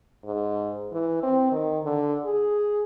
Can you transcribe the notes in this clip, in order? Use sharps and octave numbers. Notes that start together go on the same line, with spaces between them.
G#2
E3
C4
D#3
D3
G#4